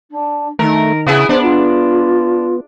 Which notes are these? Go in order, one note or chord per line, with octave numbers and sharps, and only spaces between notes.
D4
D#3 A3 A#4
C#3 B3 E4 G#4
B3 D4 C5
F4